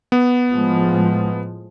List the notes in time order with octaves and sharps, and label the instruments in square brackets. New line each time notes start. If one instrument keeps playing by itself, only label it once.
[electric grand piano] B3
[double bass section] A2 F3 G#3